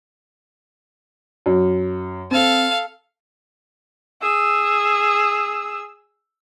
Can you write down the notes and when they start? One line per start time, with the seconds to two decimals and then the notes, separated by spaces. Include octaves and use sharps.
1.46 F#2
2.31 C4 A4 F5
4.22 G#4 E6